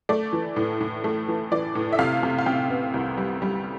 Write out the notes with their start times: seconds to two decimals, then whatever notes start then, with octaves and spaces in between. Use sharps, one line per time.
0.09 A3 D5
0.32 E3
0.56 A2
0.81 A2
1.04 A3
1.28 E3
1.51 E3 D5
1.75 A2
1.93 E5
1.99 C3 F5
2.23 C3
2.38 F5
2.46 C3 G5
2.70 B3
2.94 C2
3.17 G3
3.42 G3